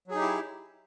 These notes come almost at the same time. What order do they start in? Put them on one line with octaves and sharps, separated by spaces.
F#3 G#4 D#4 G4 E4